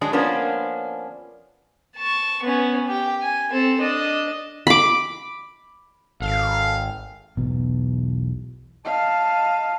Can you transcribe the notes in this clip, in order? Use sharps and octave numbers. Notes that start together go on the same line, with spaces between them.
F#3 G#3 D4 G#4
F3 A#3 B3 C#4 D4
A5 C#6
B3 C#4
G4 G5
G#5
C4 A4
D4 D#5
B5 D6
G#1 A4 F5
B1 E2 B2
D#5 F5 A5